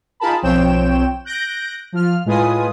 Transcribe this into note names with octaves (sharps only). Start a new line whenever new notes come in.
D#4 F4 G#4 A#4 A5 B5
B1 F3 C4 C#5 G5 E7
F#6 G6 A#6 D7
F3 F4 F6
A2 G#3 F4 B4 G#5 D#6